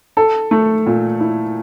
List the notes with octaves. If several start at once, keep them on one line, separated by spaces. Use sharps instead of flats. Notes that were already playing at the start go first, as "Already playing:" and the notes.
A4
A3
A#2
E4